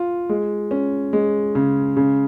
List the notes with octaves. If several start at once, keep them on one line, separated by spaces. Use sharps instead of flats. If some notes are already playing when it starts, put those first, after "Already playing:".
Already playing: F4
G#3
C#4
G#3
C#3
C#3